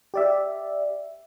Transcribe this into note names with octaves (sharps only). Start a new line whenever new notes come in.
G4 D5 E5